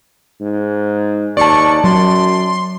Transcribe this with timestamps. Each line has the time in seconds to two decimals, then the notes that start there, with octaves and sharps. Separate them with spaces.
0.41 G#2
1.37 D#2 D5 A5 C#6
1.84 F#2 F#3 C6